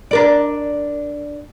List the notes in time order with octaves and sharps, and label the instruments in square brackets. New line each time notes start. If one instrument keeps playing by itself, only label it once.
[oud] D4 A#4 D5